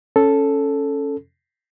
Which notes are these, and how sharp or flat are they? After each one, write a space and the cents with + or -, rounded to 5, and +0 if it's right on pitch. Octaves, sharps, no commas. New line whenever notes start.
C#4 +0 A4 +0